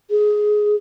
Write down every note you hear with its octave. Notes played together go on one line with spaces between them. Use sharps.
G#4